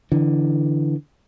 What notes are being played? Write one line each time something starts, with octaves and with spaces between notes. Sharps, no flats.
D3 E3